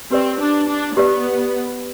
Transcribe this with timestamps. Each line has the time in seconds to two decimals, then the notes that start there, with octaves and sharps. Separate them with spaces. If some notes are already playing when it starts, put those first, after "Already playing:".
0.11 C4 G4 B4 D5
0.40 D4
0.69 D4
0.97 B3 G4 B4 D5